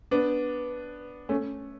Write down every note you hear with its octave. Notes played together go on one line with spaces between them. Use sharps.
B3 D4
A3 C#4